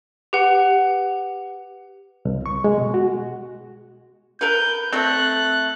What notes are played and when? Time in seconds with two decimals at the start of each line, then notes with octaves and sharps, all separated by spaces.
0.33 G4 B4 F#5
2.25 C2
2.46 C#6
2.64 G#3
2.78 B2
2.94 F#4
4.41 A#4 B4 G6
4.92 A3 C4 F#6